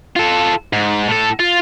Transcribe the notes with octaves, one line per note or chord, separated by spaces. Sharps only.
F4 A4
G#2
A2 A4
F4